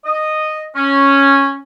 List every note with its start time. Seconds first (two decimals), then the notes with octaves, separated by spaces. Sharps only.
0.05 D#5
0.76 C#4